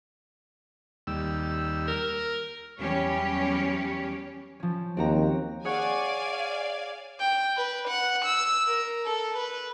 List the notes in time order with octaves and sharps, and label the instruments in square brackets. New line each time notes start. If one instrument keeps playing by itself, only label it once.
[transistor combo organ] D#2 G3 E6
[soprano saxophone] A#4
[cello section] E2 F#3 G3 C#4 G4 C#5
[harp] F3 C#4
[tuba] D#2 [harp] C4 F#4 A#5
[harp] G#4 C#5 F#5 [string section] D5 F5 G#5
[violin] G5
B4
F#5
E6
A#4
A4
B4